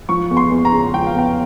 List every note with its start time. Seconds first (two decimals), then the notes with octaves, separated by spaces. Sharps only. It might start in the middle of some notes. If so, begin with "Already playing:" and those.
0.09 F3 C#6
0.31 E2
0.37 C6
0.51 E2
0.65 A#5
0.72 C#3
0.94 F3 G5
1.07 F5
1.16 E2 G5